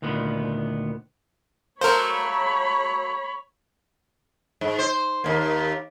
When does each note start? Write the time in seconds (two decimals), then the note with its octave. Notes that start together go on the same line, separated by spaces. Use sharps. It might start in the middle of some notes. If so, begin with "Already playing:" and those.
0.02 D2 A#2 D#3 B3
1.81 F#3 A3 A#3 A#4 C5 C#5 B5
4.61 G#2
4.79 C5
5.24 D#2 A#3